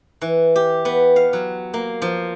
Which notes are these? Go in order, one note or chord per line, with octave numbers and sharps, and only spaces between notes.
E3
G4
B3
F5
F#3
A#3
F3